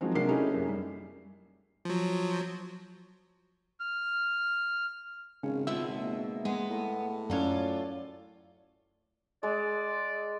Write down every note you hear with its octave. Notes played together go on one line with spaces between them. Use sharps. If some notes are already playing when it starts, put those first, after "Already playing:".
D#3 F3 F#3 G#3 C4
C3 F#3 G#3 A#3 D4 C7
A3 C#4 D#4 E4 G4 G#4
F#2 A#3
G3
F3 F#3
F6
G#1 C#3 G#4
B2 G#3 F4 E5
A#3
G#3 B3
A2
F#2 C#4 F4 A4 D5
G#3 D5